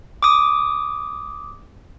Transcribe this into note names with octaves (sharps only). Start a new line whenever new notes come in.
D6 D#6